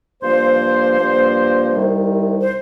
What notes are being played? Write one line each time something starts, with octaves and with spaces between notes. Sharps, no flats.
G2 F3 A#3 C5
G2 F3 A#3
C2 C3 D#3 G3
C5